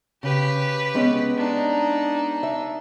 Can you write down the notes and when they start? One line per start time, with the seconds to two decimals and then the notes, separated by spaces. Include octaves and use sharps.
0.23 C#3 G4 B4
0.94 G#3 B3 C#4
1.37 D4 D#4
2.43 E5